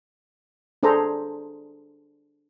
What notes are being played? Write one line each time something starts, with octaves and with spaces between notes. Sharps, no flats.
D4 G#4 A4 C5 A#5